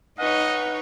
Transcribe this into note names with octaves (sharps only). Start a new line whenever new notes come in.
D#4 B4 C#5 D#5 F#5